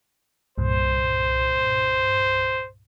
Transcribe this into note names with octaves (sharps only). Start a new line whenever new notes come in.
C2 G2 A#2 C5